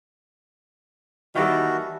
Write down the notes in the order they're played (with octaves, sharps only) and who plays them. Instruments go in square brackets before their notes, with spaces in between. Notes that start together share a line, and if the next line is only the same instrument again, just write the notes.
[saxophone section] D#2 D#3 [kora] E3 G3 A4 [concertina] F#4